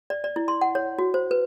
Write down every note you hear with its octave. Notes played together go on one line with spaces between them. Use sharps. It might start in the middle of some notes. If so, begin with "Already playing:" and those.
D5
D5
E4
C6
F#5
C#5
F#4
C5
B4